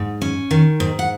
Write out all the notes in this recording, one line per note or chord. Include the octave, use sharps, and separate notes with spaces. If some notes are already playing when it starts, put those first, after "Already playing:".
Already playing: G#2
C#4
D#3
G#2
F#5